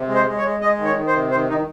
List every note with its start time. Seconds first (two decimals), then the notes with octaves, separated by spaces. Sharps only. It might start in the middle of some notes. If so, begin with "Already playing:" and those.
Already playing: C3
0.08 G#3
0.15 C5
0.26 G#3
0.37 C#5
0.43 G#3
0.61 G#3 D#5
0.78 D#3
0.85 C#5
0.95 D#3
1.07 C5
1.13 C3
1.31 D#3 C5
1.48 D#3 D#4